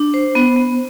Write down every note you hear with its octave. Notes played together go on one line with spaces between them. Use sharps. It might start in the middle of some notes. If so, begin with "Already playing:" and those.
Already playing: D4
C5
B3
B3